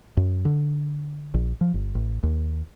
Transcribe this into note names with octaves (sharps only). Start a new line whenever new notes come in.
F#2
D3
A#1
F3
G1
A1
D#2